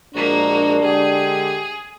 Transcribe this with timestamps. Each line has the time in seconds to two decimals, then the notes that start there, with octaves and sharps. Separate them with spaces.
0.15 A#1 G#3 A#3 D4 F#4 A#4
0.82 D3 G#3 G4 G#4